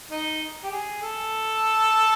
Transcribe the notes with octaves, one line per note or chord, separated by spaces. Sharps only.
D#4
G4
G#4
A4